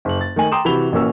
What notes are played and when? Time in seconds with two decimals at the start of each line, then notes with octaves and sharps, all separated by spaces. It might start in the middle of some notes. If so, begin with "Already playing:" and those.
0.05 F#1 F#7
0.21 A6
0.36 D#3 A3 D#5 G#5 F#7
0.52 G5 A#5 C6 D6 D#6 E7
0.65 C3 E3 F#4 B5 F7 G7
0.92 A1 A#2 C#4 F#4 A#4 E6